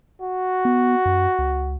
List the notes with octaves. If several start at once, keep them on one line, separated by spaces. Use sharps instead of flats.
F#4
B3
F#2
C#2